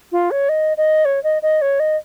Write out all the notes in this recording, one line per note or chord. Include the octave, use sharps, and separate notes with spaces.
F4
C#5
D#5
D#5
C#5
D#5
D#5
C#5
D#5